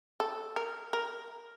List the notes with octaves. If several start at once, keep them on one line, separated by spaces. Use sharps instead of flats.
A4
A#4
A#4